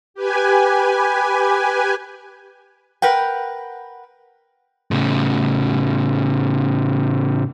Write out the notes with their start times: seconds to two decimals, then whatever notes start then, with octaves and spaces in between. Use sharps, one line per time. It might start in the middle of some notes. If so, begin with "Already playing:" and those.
0.14 G4 B4 G#5
3.02 A#4 B4 F#5 G5
4.91 A2 C#3